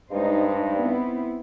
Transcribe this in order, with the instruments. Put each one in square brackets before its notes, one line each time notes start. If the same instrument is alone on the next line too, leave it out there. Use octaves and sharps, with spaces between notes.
[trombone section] G2 [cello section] G#3 D#4 C5
[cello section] B3 C4 E4